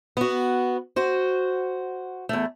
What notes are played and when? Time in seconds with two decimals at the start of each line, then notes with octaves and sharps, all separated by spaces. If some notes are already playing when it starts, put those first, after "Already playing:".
0.17 B3 F#4
0.96 F#4 C5
2.29 E2 A3